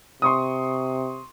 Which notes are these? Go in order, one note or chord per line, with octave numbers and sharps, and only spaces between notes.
C3 C6 C#6 D#6